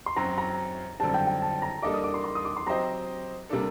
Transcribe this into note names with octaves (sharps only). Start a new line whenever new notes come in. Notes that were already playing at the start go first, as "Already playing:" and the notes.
C6
F#2 F#3 C4 F#4 A#5
A#5
F#2 D3 G3 C4 A5
G5
G5
A5
A#5
G3 A#3 D4 A4 D#5 D6
D#6
D6
C6
C6
D#6
D6
C6
F#3 C4 G4 C5 D#5 A#5
C3 G3 A#3 D4 A4